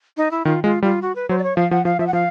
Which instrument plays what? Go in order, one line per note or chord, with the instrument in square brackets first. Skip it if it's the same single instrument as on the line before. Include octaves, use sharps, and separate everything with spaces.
[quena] D#4
E4
[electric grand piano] D#3 [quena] F4
[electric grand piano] G#3 [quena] F4
[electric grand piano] G3 [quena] F4
[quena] F#4
B4
[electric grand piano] F#3 [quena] C5
[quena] D5
C#5
[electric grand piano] F3 [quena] F5
[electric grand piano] F3 [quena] F#5
[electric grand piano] F3 [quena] F5
[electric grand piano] F3 [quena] E5
[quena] F#5
[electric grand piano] F3 [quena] F5